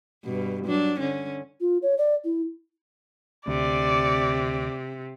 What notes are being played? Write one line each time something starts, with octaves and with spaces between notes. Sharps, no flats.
G2 B2
F#3 D4
D3 C#4
F4
C#5
D5
E4
D2 C3 D5